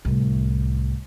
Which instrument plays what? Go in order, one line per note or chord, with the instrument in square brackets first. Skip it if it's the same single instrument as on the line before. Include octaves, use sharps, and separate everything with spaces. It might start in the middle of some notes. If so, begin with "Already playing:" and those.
[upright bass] C2 A2